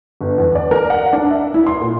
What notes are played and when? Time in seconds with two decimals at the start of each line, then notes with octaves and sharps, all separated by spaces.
0.21 G1
0.38 E2
0.55 D5
0.71 A#4
0.90 F#5
1.13 D4
1.31 E5
1.54 E4
1.67 C6
1.81 A#2